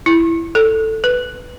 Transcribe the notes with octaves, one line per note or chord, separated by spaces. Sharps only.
E4
A4
B4